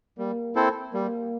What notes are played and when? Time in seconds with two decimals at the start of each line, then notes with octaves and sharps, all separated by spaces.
0.18 G3 A#3
0.56 C4 E4 A4 C5
0.93 G3 A#3